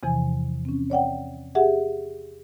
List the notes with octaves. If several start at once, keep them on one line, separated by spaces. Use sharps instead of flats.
E2 C3 E3 F3 G#5
C4 C#4
C#5 D5 F#5 G5
G4 G#4 E5 F#5